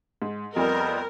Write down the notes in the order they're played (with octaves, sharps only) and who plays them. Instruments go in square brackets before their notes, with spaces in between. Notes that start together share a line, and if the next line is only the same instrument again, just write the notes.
[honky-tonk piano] G#2
[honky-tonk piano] F2 G3 [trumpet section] B3 D#5 G5 [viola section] A#4